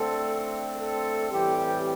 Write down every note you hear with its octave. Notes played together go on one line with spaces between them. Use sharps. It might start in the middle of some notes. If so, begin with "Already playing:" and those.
Already playing: D3 A3 C4 A4
A4
A2 E3 G3 C4 G4